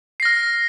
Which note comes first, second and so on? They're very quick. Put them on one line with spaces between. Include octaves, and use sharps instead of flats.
C7 A#6 F6